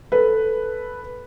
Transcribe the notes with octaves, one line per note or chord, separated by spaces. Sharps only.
A4 B4